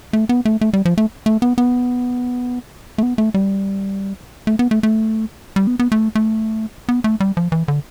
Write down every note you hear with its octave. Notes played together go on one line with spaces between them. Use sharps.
A3
B3
A3
A3
G3
F3
A3
A3
B3
B3
A3
B3
A3
G3
A3
B3
A3
A3
G3
B3
B3
A3
A3
B3
A3
G3
F3
E3
D3